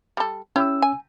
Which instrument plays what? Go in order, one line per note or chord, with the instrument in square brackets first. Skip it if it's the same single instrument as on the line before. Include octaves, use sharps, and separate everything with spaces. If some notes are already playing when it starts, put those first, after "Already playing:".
[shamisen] G3 A4
[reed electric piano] C#4 E6 [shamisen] E4 G4
[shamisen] G#5